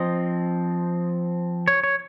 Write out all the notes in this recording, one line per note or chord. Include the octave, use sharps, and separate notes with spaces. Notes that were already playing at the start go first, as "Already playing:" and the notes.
Already playing: F3 C4 D#5
C#5
C#5